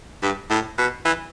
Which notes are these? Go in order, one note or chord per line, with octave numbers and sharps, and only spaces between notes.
G2
A2
B2
E3